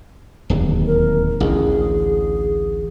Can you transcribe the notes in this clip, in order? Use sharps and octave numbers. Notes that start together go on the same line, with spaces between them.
D1 D#2
A#4
A1 D2 G#4